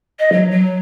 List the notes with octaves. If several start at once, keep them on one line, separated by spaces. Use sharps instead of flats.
D#5
F#3
F#3